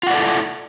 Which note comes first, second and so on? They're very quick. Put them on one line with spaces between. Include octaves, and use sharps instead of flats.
F4 F#5 D5 A4 E4